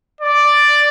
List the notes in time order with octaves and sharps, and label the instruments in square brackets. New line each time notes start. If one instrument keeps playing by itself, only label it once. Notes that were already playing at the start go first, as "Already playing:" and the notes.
[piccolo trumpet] D5